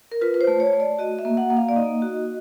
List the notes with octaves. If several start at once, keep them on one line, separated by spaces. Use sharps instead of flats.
A#4
F4 B4
B4
C5
A3
C#5
A3
D5
F#4 D#5
E5
A#3
F#5
A#3
F5
D5
D#4 D#5
F#4